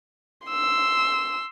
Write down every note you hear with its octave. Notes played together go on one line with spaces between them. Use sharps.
C6 E6